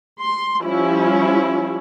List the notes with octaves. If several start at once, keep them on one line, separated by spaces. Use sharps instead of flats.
C6
F3 G3 C#4 E4